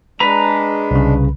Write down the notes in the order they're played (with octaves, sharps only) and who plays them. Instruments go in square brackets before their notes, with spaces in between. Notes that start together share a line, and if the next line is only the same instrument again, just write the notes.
[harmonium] G#3 D4 [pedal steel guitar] B4 A#5
[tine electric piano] C2 C#3